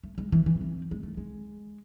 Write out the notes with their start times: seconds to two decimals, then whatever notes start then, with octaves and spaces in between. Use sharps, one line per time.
0.04 A3
0.18 G#3
0.32 E3
0.46 E3
0.61 C4
0.91 G#3
1.03 A3
1.17 G#3